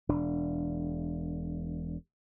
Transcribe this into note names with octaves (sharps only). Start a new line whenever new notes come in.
E1 D4